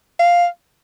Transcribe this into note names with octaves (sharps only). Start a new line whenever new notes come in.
F5